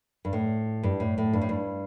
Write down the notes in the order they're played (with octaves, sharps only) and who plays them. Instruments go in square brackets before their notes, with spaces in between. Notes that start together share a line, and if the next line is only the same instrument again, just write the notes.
[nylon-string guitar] G2
A2
G2
A2
A2
G2
A2
G2